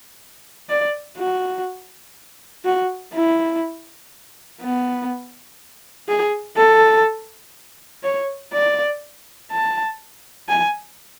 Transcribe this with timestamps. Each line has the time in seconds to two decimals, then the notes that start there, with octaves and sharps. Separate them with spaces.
0.69 D5
1.17 F#4
2.65 F#4
3.14 E4
4.61 B3
6.08 G#4
6.56 A4
8.03 C#5
8.53 D5
9.51 A5
10.49 G#5